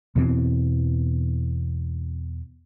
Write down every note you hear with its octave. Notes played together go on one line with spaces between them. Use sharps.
E2 B2 E3 C4